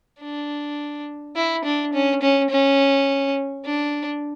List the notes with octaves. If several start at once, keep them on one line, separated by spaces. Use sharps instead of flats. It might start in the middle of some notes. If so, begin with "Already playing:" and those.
D4
E4
D4
C#4
C#4
C#4
D4